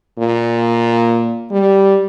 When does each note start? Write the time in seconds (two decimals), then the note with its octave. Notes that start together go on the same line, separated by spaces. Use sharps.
0.19 A#2
1.51 G3